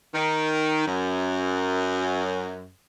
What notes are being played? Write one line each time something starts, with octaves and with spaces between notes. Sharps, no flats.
D#3
F#2